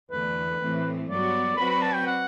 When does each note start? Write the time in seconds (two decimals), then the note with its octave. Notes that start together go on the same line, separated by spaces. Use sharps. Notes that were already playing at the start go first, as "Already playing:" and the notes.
0.11 E2 D3 A3 B4
0.60 A2 E3 A3 C4
1.09 G2 F#3 B3 F#4 D5
1.57 F#3 C4 F#4 B4 D5 B5
1.70 B5
1.82 A5
1.94 G5
2.07 F#5